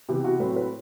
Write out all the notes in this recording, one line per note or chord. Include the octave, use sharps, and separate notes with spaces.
C3 E3 B3 G4
F#4
A2 F#3 C4 B4
B4